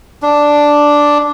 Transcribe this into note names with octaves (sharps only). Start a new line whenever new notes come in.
D4